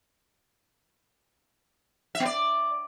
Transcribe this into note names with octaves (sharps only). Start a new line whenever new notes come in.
E5
B3
D5